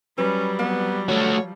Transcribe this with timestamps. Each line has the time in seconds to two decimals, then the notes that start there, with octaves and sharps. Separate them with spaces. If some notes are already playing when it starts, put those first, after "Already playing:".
0.18 F#3 G3 C#4 B4
0.59 F2 B3
1.09 F3 A3 F#4 C#5